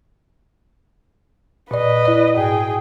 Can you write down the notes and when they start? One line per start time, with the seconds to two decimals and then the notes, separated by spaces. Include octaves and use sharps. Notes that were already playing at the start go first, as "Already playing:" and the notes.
1.71 A#2 B4 D5 D#5
2.05 E4 D5
2.37 G#2 G#4 G5